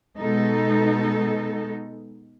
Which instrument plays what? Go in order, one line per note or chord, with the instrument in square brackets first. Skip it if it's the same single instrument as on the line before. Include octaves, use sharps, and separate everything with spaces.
[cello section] B2 G#3 B3 D#4 A4